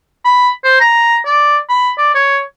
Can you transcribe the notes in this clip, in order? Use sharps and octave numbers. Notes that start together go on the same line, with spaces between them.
B5
C5
A#5
D5
B5
D5
C#5